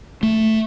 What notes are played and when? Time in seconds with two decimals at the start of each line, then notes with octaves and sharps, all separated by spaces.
0.23 A3